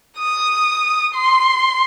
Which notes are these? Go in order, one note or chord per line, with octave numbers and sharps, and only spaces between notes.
D#6
C6